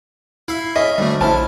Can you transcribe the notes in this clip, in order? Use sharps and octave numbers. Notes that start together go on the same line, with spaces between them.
E4 E5 F5
C#4 D#5 E5
D2 G3 A3
A#1 F3 E4 A5 F6